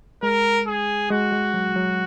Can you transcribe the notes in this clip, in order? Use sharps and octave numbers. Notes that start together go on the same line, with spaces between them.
G#3 A#4
G#4
G#3 F#4
G#3
F#3
F#3